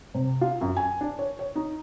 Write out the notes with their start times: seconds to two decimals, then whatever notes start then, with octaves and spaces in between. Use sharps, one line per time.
0.14 C3
0.41 F4
0.61 F#2
0.77 G#5
1.01 D4
1.19 C#5
1.39 C#5
1.55 D#4